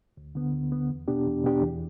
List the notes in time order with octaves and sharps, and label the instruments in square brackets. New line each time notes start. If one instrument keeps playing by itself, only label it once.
[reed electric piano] D2
D3 B3
D2
D3 B3
E2
B2 B3 D4 G4
E2
B2 B3 D4 G4
E2